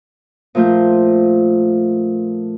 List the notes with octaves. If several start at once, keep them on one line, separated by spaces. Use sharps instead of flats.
A#2 F3 A3 F4 G6